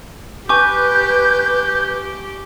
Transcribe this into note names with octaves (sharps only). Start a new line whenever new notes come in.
G4 B4 G#5 C#6 D6 G6